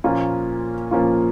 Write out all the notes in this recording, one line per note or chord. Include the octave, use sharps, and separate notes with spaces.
A#2 F3 A#3 C#4 F4
A#2 F3 A#3 C#4 F4